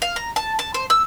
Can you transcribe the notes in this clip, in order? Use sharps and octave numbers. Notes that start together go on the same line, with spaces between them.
F5
A#5
A5
A5
C5
E6